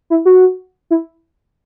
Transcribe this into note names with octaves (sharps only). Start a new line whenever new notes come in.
E4
F#4
E4